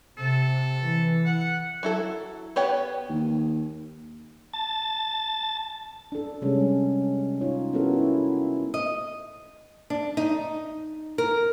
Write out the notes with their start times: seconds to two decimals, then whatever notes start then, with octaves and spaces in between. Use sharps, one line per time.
0.18 C3 A4
0.81 E3
1.25 F#5
1.83 F#3 E4 A4
2.56 B3 G4 C#5 G5
3.09 D#2
4.54 A5 A6
6.12 D4 A4
6.42 C3 G3 G#3 C#4
7.41 D#4 F4 C#5
7.73 B3 C#4 E4 F#4 A4 A#4
7.94 E4
8.74 D#5
9.90 D4
10.17 D#4
11.18 A#4